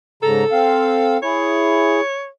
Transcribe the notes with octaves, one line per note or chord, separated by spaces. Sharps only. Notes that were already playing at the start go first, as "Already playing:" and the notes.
G#2 C#3 A4 A#5
C4 F5
E4 G#4 C#5